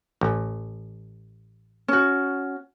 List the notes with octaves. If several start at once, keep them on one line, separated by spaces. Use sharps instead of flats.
A1
C#4 F#4